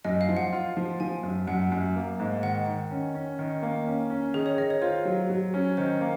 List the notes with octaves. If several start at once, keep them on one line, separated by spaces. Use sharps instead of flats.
F#2 D#5
F5
F3
F#5
F4
F3
F3 G#5
F#2
F#2 F#5
F#2
A#3
G#2
D#3 F#5
D#3
C#4
C#4
D#3
A#3
C#4
C#4
D#3 G#4
C#5
D#3 D#5
C#5
F4 C5
F#3
F#3
C#4
D#3 C5
A#3